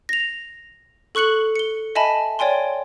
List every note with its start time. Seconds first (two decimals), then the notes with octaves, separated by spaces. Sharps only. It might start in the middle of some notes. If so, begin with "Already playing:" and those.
0.09 A#6 F7
1.15 A4 C#6 F#6 C#7 F#7
1.55 C#7 G7
1.95 D#5 E5 G#5 A5 B5
2.39 C#5 D5 G5 G#5 C6